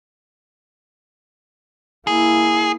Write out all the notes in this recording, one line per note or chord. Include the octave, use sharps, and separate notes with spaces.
A#3 E4 G#4